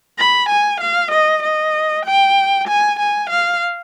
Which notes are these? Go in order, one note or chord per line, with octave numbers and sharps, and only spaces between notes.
B5
G#5
F5
D#5
D#5
G5
G#5
G#5
F5